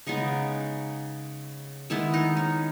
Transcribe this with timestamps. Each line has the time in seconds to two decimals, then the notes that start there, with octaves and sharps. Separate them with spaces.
0.07 C#3 G#3 B3 D#4
1.90 D#3 G#3 B3 E4
2.14 D#4
2.37 C#4